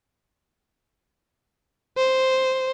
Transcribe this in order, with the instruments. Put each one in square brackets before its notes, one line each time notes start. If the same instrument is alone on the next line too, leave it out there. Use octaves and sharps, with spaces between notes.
[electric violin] C5